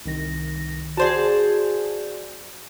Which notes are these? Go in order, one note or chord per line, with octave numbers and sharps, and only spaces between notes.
C2 D#3 A#6
F#4 G#4 C5 D5 A5